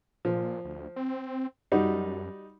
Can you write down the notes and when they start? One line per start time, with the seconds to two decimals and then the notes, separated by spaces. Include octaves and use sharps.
0.25 A#2 F3
0.64 D2
0.96 C4
1.72 F#2 G3 D#4 F#4